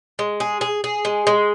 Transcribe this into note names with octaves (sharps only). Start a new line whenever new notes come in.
G#3
G#4
G#4
G#4
G#3
G#3